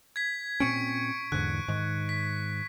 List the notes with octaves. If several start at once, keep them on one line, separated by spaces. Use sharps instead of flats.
G#6 B6
A#2 C4 C#4 C#6 C#7 D7
E2 G#2 D3 F#6
G#2 D#3
B6